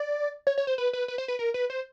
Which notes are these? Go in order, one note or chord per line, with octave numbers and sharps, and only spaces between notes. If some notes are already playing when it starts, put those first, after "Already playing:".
Already playing: D5
C#5
C#5
C5
B4
B4
B4
C5
B4
A#4
B4
C5